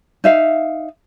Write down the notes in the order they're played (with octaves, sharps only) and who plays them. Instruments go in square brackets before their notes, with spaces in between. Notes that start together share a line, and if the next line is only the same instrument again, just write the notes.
[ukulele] D#4 E5 F5